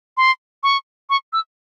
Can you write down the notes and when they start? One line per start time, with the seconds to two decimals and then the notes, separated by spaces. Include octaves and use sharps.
0.17 C6
0.63 C#6
1.10 C#6
1.33 E6